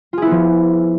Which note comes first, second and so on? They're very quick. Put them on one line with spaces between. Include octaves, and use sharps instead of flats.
F4 G#4 E4 B3 F3